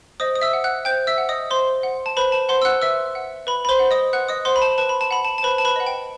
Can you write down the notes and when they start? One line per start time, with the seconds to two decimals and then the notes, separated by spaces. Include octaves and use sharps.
0.20 C5 D#5 D#6
0.35 D#6
0.41 E5 E6
0.53 F#5
0.64 F#5 F#6
0.85 C5 G5 G6
1.07 E5 E6
1.18 F#5
1.29 D#5 D#6
1.50 C5 C6
1.83 F#5
2.06 A5
2.17 B4 C5 B5
2.32 A5
2.49 C5 F#5 C6
2.62 E6
2.65 F#5 F#6
2.81 B4 E5 E6
3.15 F#5
3.47 B4 B5
3.65 B5
3.69 C5 C6
3.79 F#5
3.91 D#5 D#6
4.13 B4 F#5 F#6
4.28 D#5 D#6
4.45 C5 F#5 C6
4.56 B5
4.62 A5
4.78 B4 A5
4.89 B5
5.01 A5
5.11 F#5 B5
5.25 A5
5.38 A5
5.43 B4 C5 B5
5.58 A5
5.65 B4 B5
5.76 D#5 F#5
5.87 G5